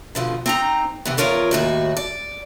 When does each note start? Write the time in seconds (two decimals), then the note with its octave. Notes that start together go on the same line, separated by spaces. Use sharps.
0.15 B2 D3 F3
0.46 C4 D#4 A#5
1.05 C3 E3 B3
1.17 E2 E3 F4 A#4 C#5 D5
1.51 D#2 A2 F#4
1.97 D5